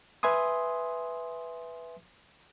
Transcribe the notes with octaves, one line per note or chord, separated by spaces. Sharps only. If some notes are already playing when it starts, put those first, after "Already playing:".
B4 E5 G#5 C6 D#6